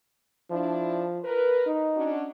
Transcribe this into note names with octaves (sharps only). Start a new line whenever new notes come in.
F3 D4 E4
A#4 B4
D#4
C#4 D4 F#4